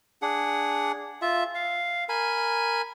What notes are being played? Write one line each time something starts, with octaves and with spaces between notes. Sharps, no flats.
D4 G#4 F#5
F4 E5
F5
A#4 G#5 B5